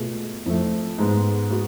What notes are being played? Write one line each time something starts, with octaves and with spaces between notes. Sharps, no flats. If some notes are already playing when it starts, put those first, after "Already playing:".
Already playing: B2 A3 F4 G#4
F2 F3 A3
G#2 G#3 B3
G#3 B3 F#4